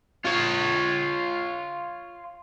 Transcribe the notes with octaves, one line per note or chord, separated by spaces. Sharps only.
F4 C#5